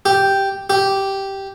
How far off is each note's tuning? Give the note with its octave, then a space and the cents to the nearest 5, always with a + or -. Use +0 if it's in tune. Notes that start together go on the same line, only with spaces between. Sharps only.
G4 +0
G4 -5